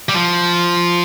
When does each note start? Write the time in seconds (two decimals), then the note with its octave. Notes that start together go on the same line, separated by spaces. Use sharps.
0.09 G3
0.14 F3